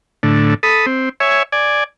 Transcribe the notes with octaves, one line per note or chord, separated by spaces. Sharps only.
A2 D3
A4 B5 D#6
C4
C#5 E5 G#5
D5 G#5